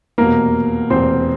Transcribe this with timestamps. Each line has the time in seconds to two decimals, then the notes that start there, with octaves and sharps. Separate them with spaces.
0.18 F1 E2 B2 A#3 A#4
0.90 F1 E2 B2 C4 C5